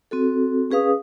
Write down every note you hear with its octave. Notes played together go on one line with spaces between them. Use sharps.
C4 F#4 A4
C#4 G#4 B4 F5 D#6